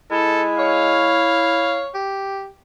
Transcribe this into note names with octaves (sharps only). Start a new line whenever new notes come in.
G#3 E4 A4
C#5 F5
G4